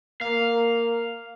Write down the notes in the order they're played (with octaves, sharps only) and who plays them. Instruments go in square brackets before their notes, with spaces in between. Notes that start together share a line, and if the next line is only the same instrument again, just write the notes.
[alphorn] A#3 [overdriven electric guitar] F5